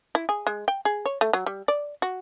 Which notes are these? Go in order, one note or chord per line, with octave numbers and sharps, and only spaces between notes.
E4
G#4
G#3
G5
G#4
C#5
A3
F#3
G3
D5
F#4